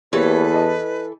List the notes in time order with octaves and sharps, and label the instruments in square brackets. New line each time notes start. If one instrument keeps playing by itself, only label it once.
[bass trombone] E2 [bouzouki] E3 A4 [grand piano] A#3 G4 C#5 [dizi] B4
[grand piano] D#5 A5